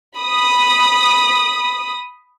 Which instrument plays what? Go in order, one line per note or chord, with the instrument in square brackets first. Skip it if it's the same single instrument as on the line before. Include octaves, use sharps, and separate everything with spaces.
[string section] B5 D#6